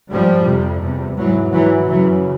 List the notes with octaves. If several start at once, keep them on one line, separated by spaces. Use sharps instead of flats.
G#2 F3 G3
F2 C3
E2 C3
G#2 E3 F#3
G#2 E3 F#3
F#2 C#3 E3 F#3